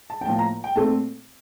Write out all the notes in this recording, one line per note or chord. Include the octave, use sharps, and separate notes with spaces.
A5
G5
A2 F3 A#3 A5
A#5
G5
A#2 A3 C4 A5